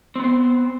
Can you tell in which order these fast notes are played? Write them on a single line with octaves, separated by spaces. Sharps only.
C4 B3 C5